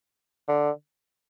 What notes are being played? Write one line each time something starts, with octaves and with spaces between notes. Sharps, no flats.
D3